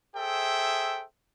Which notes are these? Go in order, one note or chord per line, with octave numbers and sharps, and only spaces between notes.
G#4 A4 C5 E5 G5